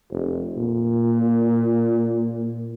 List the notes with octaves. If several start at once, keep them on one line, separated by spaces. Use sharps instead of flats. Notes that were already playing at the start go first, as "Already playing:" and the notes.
F1
A#2